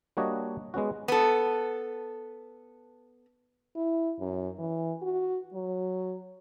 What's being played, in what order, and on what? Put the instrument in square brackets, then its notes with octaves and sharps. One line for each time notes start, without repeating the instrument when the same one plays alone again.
[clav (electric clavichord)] G3 A#3 D4 F#4 C#5 D#5
G#3 B3 C#4 F#4
[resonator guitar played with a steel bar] B3 A4
[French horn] E4
F#2
E3
F#4
F#3